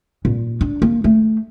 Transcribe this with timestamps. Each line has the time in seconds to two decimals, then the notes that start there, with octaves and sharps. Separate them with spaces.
0.25 A#2
0.61 D4
0.82 A#3
1.04 A3